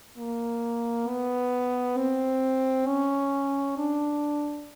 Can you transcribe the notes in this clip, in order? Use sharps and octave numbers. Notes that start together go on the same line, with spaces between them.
A#3
B3
C4
C#4
D4